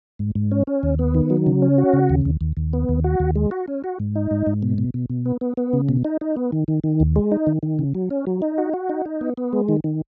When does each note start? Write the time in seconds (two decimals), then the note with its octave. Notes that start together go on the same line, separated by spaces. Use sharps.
0.19 G#2
0.35 G#2
0.51 C#4
0.67 C#4
0.83 D#2
0.99 B3
1.14 D#3
1.30 F#3
1.47 C#3
1.62 C#4
1.78 F#4
1.93 C#3
2.10 D#2
2.25 D#2
2.41 D#2
2.57 D#2
2.73 B3
2.89 D#2
3.04 F#4
3.20 D#2
3.36 G#3
3.51 F#4
3.68 C#4
3.84 F#4
4.00 G#2
4.15 D#4
4.31 G#2
4.47 G#2
4.63 B2
4.78 B2
4.94 B2
5.10 B2
5.25 B3
5.41 B3
5.57 B3
5.73 C#3
5.89 B2
6.05 D#4
6.21 D#4
6.36 B3
6.52 D#3
6.68 D#3
6.84 D#3
7.00 D#2
7.16 G#3
7.32 D#4
7.47 D#3
7.63 D#3
7.79 C#3
7.95 F#3
8.11 C#4
8.27 F#3
8.42 D#4
8.58 F#4
8.73 F#4
8.89 D#4
9.06 D#4
9.21 B3
9.37 B3
9.53 G#3
9.69 D#3
9.84 D#3